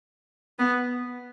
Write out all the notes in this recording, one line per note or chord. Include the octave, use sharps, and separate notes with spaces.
B3